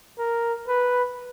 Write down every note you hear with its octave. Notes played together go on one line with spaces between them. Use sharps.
A#4
B4